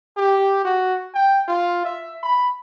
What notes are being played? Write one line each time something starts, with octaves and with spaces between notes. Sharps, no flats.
G4
F#4
G5
F4
E5
B5